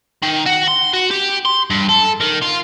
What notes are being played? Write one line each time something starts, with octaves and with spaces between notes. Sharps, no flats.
D#3
F#4
C6
F#4
G4
C6
G2
A4
D#3
F4